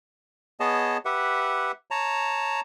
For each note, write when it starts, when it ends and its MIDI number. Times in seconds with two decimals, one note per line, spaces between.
0.60 0.97 59
0.60 0.97 68
0.60 0.97 73
0.60 0.97 75
0.60 0.97 81
1.05 1.72 67
1.05 1.72 71
1.05 1.72 76
1.05 1.72 78
1.91 2.60 73
1.91 2.60 81
1.91 2.60 82